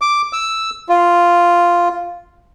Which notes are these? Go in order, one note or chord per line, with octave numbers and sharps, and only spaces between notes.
D6
E6
F4